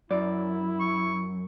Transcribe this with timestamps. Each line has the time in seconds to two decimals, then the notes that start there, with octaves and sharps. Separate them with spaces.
0.11 F#2 E4 D5
0.80 C#6